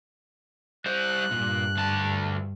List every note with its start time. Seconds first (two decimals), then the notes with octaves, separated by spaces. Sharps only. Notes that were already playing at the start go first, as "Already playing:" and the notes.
0.86 G3 C5 F#6
1.31 G2 A#2
1.77 D2 A5